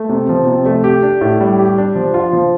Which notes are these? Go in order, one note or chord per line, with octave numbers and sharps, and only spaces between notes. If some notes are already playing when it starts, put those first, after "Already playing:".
Already playing: A3
C3
F3
C3
A3
G4
D4
A2
G3
G4
D4
F3
F4
F3